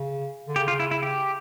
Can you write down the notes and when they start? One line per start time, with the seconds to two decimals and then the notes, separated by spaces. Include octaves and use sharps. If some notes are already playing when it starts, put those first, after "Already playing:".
Already playing: C#3
0.48 D3
0.56 C#3 G4
0.68 F4
0.80 E4
0.91 E4
1.03 G4